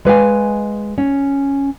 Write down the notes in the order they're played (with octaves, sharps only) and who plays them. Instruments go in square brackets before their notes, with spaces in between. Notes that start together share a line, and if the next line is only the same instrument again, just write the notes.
[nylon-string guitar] G#3 B4 F5 G#5
C#4